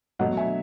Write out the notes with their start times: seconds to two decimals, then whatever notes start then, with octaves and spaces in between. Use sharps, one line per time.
0.19 B2 F#3 A3 D#5 F#5
0.37 E5 G#5